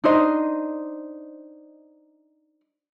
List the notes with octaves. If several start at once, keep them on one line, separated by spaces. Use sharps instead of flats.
D4 D#4 C5 D#5